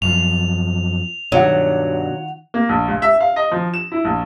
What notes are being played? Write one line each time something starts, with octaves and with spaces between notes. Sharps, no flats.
F#2 F3 F7
G2 B2 D#3 F#3 F4 F#5
A#3
A#1
C#2
E5
F5
D#5
F3
E7
E4
A#1